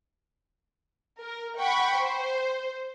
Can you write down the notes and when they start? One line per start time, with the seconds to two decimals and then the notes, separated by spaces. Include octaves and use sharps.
1.22 A#4
1.59 F#5 G5 B5 C#6
1.98 C5